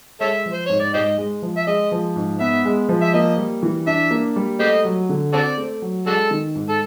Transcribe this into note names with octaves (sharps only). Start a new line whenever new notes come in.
G#3 A4 C#5 E5
F3
C5
G#2 C#5
D5
G#2 G4 C5 D#5
G#3
F3
E5
G#3 D#5
F3
G#2
B3 E5
G#3
F3
E5
A#3 D#5
G3
E3
D4 E5
A#3
G3
A3 G4 C5 D#5
F#3
D3
C4 F#4 A4 D5
A3
F#3
G#3 D4 F#4 A4
D#3
G#2
A4